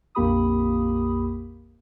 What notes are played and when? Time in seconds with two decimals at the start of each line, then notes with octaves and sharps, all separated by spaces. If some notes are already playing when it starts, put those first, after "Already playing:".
0.15 A#1 F2 A#3 G4 B5 D#6